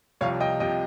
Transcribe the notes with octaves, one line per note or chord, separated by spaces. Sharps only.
C2 C3 F3 C#5 F5
D#5 G5
C3 F3 D#5 G5